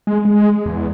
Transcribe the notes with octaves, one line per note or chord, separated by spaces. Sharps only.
G#3
G#3
E2